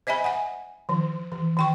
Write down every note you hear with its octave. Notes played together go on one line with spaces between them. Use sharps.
C5 D#5 E5 G#5 B5
F#5 G#5
D#3 F3
E3
D#3 G5 C#6